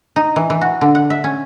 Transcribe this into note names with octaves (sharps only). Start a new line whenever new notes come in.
D#4
E3
E3
F#4
D3
F#5
E5
C#4